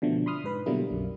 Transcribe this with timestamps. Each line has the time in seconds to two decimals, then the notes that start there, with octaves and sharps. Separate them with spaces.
0.02 B2 D3 F3 A3
0.26 B5 C6 D#6 F6
0.44 G#2 B4 B5
0.66 B2 D3 F#3 G3 A#3 E4
0.90 B1 F#2